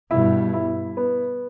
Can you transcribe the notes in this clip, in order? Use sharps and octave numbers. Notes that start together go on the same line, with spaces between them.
G2 B2 E4
E4
B3